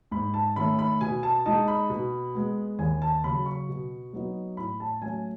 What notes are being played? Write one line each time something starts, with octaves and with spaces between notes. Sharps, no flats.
G#2 B5
A5
D#3 A3 C#4 B5
B5
B2 G#5
A5
G#3 D#4 A5
B5
B2
G#3 B3
D#2 G#5
A5
C#3 F#3 B5
C#6
B2
F#3 B3 D#4
A2 B5
A5
F#3 A3 C#4 G#5